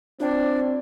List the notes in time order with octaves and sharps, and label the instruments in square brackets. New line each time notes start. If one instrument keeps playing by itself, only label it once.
[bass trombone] C4 [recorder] D4 [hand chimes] F4 D5 G5